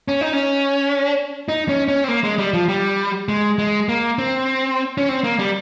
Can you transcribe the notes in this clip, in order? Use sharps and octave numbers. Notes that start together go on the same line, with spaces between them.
C#4
D#4
C#4
D#4
C#4
C#4
C4
A#3
G#3
G3
F3
G3
G#3
G#3
A#3
C4
C#4
C4
A#3
G3